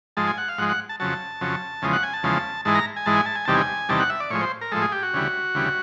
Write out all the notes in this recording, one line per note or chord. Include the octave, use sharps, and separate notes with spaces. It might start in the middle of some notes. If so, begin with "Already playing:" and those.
G#2 F3 G#3 A5
G#5
F#5
F5
G#2 F3 G#3 F#5
F#5
A5
F2 C#3 F#3 A5
F2 C#3 F#3
E2 C#3 F3 G#3
F#5
G#5
A5
E2 C#3 F3 G#3
G#2 E3 G#3 A5
A#5
G#5
G#2 E3 G#3 A5
G#5
A5
G#5
E2 C3 D#3 G3 A5
G#5
E2 C3 D#3 G3 A5
F#5
E5
D5
A2 F3 G#3 C#5
C5
A#4
A2 F3 G#3 A4
G#4
G4
F#4
D2 C#3 E3 G3
D2 C#3 E3 G3